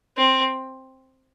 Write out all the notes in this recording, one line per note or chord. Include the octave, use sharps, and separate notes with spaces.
C4